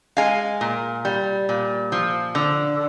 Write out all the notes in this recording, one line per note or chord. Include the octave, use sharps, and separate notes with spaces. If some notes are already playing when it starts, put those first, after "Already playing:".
G#3 F5 G#5
A#2
G3
A#2
F3
D3